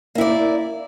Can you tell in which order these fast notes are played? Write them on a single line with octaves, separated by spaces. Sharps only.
A#3 E4 D5